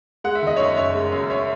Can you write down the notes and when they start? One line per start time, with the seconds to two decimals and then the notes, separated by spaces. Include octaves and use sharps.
0.24 G#3 F#5
0.35 E5
0.42 D#3 D#5
0.56 C#5 E5
0.60 F#2
0.77 F#1 C#5 E5
0.95 G#3
1.12 F#2
1.30 C#5 E5